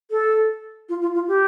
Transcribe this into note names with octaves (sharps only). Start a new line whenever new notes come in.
A4
F4
F4
F4
G4